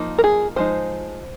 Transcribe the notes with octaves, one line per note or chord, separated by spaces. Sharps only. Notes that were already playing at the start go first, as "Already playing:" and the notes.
Already playing: F3 A#3 D#4
A#4
G#4
F3 G#3 D#4 C5